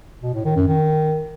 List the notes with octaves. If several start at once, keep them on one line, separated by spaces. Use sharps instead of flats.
B2
A2
D#3
F#2
D#3